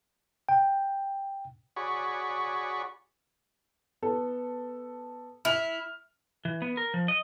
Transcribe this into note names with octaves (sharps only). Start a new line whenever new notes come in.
G5
F#4 G#4 C#5 D5 B5 C#6
B3 A4
E4 F6 F7
E3
B3
A#4
F3
D#5